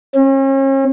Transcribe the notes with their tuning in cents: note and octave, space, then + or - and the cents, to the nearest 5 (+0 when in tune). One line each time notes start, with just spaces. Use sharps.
C#4 -40